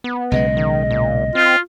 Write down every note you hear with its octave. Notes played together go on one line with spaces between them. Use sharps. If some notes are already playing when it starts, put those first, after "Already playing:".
B3
B1 C#3 G#3 D#5
D#3
A#2
C4 F4